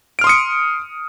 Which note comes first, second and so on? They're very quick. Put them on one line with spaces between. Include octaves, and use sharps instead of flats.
D7 F6 C6 D#6 C#7